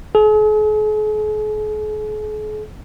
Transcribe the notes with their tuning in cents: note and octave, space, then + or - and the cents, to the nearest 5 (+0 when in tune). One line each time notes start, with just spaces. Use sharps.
G#4 +45